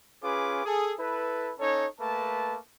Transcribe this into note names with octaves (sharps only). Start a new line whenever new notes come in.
C#4 F4 G#4 B4 D6
G#4 A4
E4 A4 B4
C#4 D#4 A4 C#5
A3 A#3 B4 A5